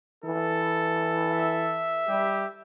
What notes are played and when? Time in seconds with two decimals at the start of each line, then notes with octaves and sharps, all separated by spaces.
0.24 E3 E4 A4
1.32 E5
2.08 G3 G4